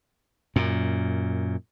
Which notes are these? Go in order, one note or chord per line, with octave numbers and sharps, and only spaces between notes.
F#2 A#2